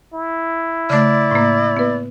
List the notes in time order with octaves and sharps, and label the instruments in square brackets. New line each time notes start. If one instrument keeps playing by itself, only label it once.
[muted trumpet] E4
[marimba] C#3 A3 [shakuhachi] D5
[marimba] A2 A#3
B3 B4